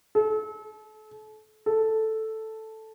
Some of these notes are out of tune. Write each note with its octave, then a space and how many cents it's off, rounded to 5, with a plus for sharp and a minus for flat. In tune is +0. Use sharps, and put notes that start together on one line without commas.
A4 -35
A4 +0